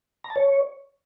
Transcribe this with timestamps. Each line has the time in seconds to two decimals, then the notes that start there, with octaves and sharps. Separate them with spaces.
0.24 A#5
0.30 A5
0.36 C#5